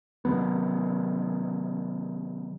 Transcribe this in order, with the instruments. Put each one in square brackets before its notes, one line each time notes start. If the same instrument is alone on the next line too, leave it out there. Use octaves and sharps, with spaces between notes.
[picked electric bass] C3 D#3 F#3 B3